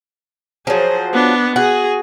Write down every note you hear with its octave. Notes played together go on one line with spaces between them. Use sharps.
F3 F#3 G#4 C5
B3 D4
F#4 G#4